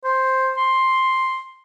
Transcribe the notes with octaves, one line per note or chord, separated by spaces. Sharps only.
C5
C6